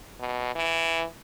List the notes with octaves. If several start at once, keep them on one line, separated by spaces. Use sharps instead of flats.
B2
E3